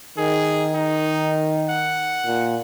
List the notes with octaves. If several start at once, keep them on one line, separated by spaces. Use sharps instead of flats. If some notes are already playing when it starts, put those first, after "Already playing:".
D#3 G#4
D#4
F#5
A#2